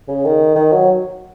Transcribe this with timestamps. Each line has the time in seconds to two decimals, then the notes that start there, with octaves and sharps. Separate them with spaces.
0.08 C#3
0.25 D#3
0.56 D#3
0.73 F#3